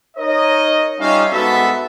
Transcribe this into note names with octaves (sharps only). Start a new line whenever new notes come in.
D#4 A#4 C#5 D#5
G3 C#4 D#4 F4 E5 F5
G#2 B3 F#4 A4 E5